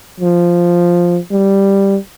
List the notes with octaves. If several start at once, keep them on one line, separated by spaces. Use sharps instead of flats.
F3
G3